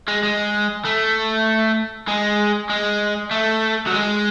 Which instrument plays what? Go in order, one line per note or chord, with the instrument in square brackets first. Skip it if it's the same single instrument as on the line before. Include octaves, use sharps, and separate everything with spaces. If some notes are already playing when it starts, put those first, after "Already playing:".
[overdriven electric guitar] G#3
G#3
A3
G#3
G#3
A3
F#3
G#3